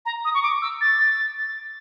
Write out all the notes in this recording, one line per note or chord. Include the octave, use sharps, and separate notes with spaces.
A#5
D#6
C#6
D6
E6
A6